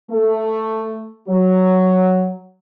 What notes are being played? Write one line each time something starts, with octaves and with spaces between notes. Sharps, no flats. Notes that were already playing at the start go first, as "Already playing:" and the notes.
A3
F#3